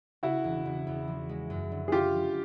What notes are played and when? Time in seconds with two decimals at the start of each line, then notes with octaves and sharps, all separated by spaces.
0.23 C#3 E4 F#4
0.44 E1
0.65 E1
0.87 E2
1.08 F3
1.29 G#3
1.50 F#2
1.72 D3
1.88 G#4
1.92 D3 F4 G4
2.14 F3